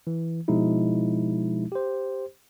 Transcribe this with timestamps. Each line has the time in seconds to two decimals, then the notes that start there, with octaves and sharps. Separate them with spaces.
0.07 E3
0.48 B2 F3 G#3 D#4 E4
1.72 G4 C5